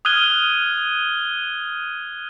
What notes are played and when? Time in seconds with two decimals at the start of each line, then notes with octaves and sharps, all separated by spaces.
0.05 D#6 F6 F#6 G#6 D#7 G7